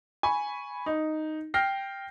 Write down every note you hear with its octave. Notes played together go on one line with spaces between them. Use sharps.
G#5 B5 C#6
D#4
G5 F6 G6 A#6 C7